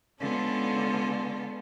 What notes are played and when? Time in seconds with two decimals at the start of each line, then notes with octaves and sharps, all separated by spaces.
0.20 D3 G#3 B3 C#4 F4 A4